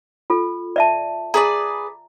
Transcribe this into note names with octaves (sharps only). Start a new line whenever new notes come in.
F4 A4
D5 E5 A5
G#4 B4 D5 A#5